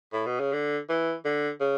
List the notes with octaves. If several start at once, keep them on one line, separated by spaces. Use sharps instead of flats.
A2
B2
C#3
D3
E3
D3
C#3